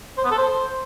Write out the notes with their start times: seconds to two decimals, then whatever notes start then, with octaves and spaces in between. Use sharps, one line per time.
0.17 C5
0.24 B3
0.31 A4
0.38 C5